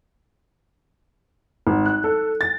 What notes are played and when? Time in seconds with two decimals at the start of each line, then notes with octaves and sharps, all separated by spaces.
1.67 G#1
1.86 F#6
2.04 A4
2.41 A6